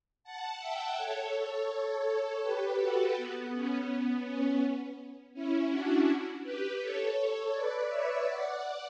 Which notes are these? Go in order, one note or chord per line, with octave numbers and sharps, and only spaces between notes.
F#5 A5
E5 G5
A4 C#5
A4 C#5
G4 B4
F#4 A4
B3
C#4
B3
C#4
C#4 E4
D4 F#4
G4 B4
A4 C#5
B4 D5
C#5 E5
D5 F#5